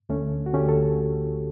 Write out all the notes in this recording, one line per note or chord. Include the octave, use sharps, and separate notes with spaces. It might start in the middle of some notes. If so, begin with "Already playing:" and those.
D2 D3 A3 C#4
F#4
D2 D3 A3 C#4 G4
A4